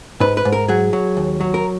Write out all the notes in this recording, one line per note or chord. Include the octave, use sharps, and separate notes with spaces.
G#2 B4
B4
G#2
A#4
F#3 G#4
F#3
D#2
F#3
A#4